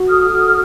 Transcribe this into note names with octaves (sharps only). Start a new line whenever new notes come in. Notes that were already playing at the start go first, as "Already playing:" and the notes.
Already playing: F#4
A4 D#6 F6
F#4